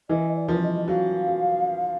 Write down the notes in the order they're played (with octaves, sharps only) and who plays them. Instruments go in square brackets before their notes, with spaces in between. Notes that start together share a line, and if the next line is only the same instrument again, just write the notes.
[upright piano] E3 [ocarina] D#5
[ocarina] D5
[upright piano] F3
[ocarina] D#5
[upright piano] F#3 [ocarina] F5
[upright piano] F#3